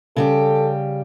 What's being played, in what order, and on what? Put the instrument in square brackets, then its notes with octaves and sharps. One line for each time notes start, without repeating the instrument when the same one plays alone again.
[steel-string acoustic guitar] C#3 G3 G4 [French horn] A4